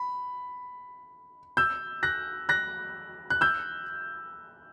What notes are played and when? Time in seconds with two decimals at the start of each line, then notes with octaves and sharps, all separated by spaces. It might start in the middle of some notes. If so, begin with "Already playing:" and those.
Already playing: B5
1.57 E6 G6
2.03 F#6 A#6
2.49 F#6 A#6
3.30 F#6
3.41 E6 G6